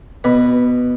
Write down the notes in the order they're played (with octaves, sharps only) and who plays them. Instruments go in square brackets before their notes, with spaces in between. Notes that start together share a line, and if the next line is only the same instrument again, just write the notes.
[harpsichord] B2 B4